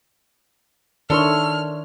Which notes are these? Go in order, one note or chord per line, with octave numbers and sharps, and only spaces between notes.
D#3 D4 E4 A4 C#5 C6 C#6 F6